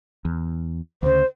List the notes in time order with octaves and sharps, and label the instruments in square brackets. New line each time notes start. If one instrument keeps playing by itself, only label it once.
[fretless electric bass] E2
[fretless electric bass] D2 C#3 [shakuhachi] C5